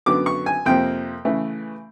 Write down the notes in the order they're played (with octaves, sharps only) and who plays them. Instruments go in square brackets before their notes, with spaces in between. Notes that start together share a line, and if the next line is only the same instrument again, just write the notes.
[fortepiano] F#2 D3 F#3 B3 D6
C#6
G#5
F2 C3 F3 A#3 G5
C#3 E3 A3